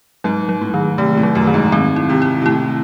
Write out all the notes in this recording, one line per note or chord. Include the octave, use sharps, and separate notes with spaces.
G#2 F#3
F#3
A2
D#3
C3 A3
A2
F#3
F#2
D#3
G#2
G#2 C4
E4
C3
E4
C3
A2 E4